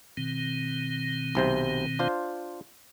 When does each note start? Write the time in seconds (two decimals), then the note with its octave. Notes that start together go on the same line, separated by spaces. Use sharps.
0.17 B2 D#3 C4
1.35 B1 C3 C5
1.99 D4 F4 C5